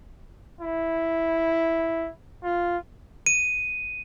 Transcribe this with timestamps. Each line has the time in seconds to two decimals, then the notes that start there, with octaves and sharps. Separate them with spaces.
0.61 E4
2.44 F4
3.26 D#7